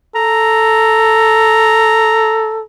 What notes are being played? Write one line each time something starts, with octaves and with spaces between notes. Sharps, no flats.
A4 A#5